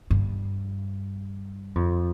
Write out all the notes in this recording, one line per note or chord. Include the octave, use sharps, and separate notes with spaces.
G2
F2